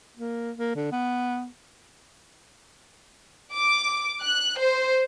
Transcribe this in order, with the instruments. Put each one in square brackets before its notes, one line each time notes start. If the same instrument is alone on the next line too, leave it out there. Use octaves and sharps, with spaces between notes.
[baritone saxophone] A#3
A#3
D3
B3
[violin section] D6
F#6
C5